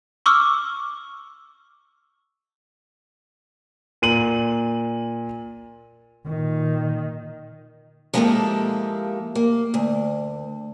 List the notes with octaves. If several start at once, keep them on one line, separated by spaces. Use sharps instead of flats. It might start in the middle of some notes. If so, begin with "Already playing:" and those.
C#6 D6 E6 F6
A#2 D#7 F#7
A#2 D#3
F3 G#3 A#3 E4 G4 A4
A#3
D2